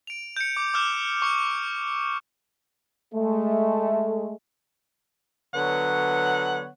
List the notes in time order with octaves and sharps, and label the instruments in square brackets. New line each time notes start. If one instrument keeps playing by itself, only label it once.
[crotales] D7 F7
G6 C#7
D6
D6 E6 F6 G6 E7
C#6 C#7
[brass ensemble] G#3 A3
[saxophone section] D3 F#3 B3 C#5 F#5